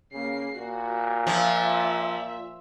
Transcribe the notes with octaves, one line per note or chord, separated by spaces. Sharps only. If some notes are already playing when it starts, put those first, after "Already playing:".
C#3 A#3 C7
A#2 F#4
F3 E5